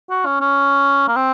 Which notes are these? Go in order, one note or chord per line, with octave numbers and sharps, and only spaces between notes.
F#4
C#4
C#4
A#3
C4